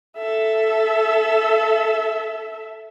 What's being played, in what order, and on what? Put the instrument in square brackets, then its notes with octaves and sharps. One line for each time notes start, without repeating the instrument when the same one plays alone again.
[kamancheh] A4 E5